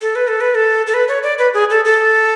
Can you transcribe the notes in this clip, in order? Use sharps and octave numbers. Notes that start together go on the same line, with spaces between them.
A4
B4
A4
B4
A4
A4
B4
C#5
D5
B4
G#4
A4
A4